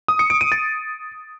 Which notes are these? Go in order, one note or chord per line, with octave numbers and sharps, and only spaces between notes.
D#6
C#7
D7
D#7
A6